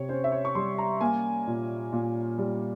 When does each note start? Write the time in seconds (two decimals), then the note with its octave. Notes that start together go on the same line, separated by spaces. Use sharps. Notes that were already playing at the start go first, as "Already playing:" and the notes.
Already playing: C3 C#5
0.09 C#4 C5
0.24 E5
0.32 C#5
0.45 C#6
0.55 G3 C6
0.78 A#5
1.01 A#3 G#5
1.47 A#2
1.93 A#2
2.38 G3